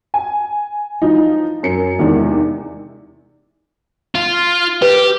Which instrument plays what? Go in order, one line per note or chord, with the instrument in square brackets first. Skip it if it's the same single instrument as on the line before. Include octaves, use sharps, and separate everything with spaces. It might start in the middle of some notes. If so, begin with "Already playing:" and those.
[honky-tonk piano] G#5
E3 F3 D#4
F#2 C#7
E2 C3 D#3 G#3 D4
[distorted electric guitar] F4
[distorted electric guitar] G4 [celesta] B4